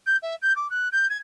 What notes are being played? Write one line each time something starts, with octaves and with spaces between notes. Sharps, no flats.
G6
E5
G6
D6
F#6
G6
G#6